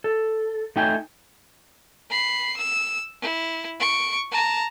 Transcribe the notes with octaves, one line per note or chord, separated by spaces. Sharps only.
A4
A3 D#4 G5 G#5
B5 C7
E6
E4
C#6 D7
A5 A#5